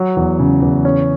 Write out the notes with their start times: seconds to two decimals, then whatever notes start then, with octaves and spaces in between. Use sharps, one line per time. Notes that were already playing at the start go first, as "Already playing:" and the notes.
Already playing: F#3
0.16 E2
0.39 C#3
0.62 E2
0.85 C#4